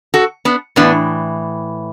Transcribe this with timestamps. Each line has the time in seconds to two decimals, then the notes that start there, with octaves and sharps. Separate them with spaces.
0.14 F#4 A4
0.45 B3 D4
0.76 A2 E3 B3 D4